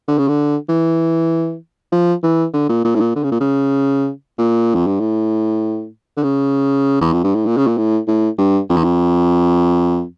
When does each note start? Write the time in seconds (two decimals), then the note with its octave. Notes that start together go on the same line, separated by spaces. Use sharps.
0.08 D3
0.18 C#3
0.28 D3
0.69 E3
1.92 F3
2.23 E3
2.54 D3
2.69 A#2
2.85 A#2
2.95 A2
3.00 A#2
3.16 D3
3.24 C#3
3.32 A#2
3.40 C#3
4.38 A#2
4.74 F2
4.87 G2
5.00 A2
6.17 D3
6.23 C#3
7.01 E2
7.13 F2
7.24 G2
7.35 A2
7.46 A#2
7.57 C#3
7.67 A#2
7.78 A2
8.08 A2
8.38 G2
8.69 F2
8.77 E2
8.84 F2